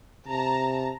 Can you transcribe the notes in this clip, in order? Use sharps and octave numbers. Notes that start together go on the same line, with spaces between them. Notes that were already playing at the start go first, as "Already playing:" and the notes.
C3 A5 A#5